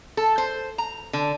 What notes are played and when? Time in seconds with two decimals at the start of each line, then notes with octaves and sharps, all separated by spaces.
0.17 A4
0.38 C5
0.78 A#5
1.13 D3